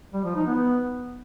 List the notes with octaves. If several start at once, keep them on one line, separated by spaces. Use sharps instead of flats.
G3
F3
D#4
B3